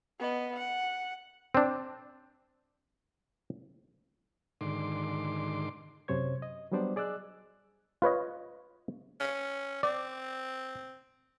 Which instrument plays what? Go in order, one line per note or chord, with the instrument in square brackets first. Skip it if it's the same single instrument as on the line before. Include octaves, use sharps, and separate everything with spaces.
[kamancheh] B3 D#5
F#5
[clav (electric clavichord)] C4 D4
[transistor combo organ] G#2 D3 D#3 C6 D6
[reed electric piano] F#2 C3 C5 C#5 G#6
D#5
F#3 G3 B3 D4 C5 D5
G#4 D5 D#5 E6 F#6
[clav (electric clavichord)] F4 B4 C#5 D#5
[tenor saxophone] C#4
[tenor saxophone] C4 [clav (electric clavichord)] D5